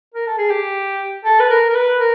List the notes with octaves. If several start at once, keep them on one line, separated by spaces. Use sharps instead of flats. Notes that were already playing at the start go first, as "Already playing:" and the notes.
A#4
A4
G#4
G4
A4
B4
A#4
A#4
B4
A#4